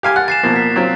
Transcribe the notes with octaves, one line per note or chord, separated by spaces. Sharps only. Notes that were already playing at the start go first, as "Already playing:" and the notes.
G4 F5 G#5
F#5 F#6 A6
G#5 A6 C7 E7
B2 F3 A#3
B6
F#3 C4 F4